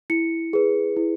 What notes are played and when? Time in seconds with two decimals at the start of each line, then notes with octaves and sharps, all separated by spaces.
0.10 E4 C#7
0.53 G#4 B4
0.97 E4